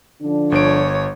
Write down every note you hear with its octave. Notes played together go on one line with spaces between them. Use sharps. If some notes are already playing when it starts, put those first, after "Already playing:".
D3 F3 D4
G1 C#5 D7